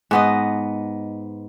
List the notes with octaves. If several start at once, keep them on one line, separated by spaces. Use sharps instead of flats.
G#2 B3 D#5